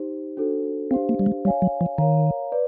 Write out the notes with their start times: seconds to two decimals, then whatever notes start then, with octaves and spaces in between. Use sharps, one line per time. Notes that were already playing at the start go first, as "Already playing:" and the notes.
Already playing: D#4 G4 C5
0.37 D4 F#4 A4 C5
0.91 C4 D4 G4 C5 F5
1.09 A#3
1.19 G3
1.26 G#3
1.44 G3 C#5 F5 G#5
1.62 F#3
1.81 F3
1.98 D#3 A#4 C#5 F5 A#5
2.52 B4 D5